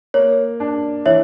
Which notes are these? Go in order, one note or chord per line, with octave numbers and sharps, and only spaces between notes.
A#3 C#5
D4
E3 C#5 E5